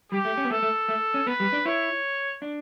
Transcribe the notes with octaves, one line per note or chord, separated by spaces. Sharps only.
G3 G4
A3
C#4
B3
A3 A4
A3
A3
C#4
B3 B4
G3
D4
E4 C#5
D4